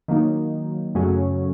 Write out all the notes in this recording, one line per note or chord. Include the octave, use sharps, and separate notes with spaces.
D#3 F#3 A#3 D#4
F#2 C#3 F#3 A3 C#4